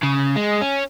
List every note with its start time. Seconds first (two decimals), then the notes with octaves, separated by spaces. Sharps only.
0.03 C#3
0.36 G#3
0.61 C#4